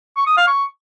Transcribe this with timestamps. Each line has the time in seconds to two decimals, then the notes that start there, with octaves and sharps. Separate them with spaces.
0.17 C#6
0.27 D#6
0.37 F5
0.47 C#6